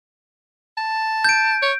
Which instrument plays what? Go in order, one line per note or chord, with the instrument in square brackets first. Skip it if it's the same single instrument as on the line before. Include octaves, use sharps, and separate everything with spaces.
[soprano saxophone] A5
[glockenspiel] G6 D7
[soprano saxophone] C#5